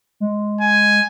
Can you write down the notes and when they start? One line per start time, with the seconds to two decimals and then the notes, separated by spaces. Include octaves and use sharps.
0.20 G#3
0.61 G#5